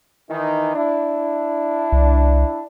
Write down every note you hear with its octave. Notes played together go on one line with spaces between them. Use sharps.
D#3 E3 D#4
D4 E4
C2